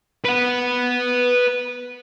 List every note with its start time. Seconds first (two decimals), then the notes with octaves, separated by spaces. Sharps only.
0.25 B4 F#5